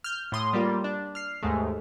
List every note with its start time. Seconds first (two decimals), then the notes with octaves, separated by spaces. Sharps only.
0.04 F6 G6
0.32 A2 C6 D#6
0.53 G3 A#3 F4
0.84 D4
1.15 F6 C7
1.42 D#2 G#2 G#3 A3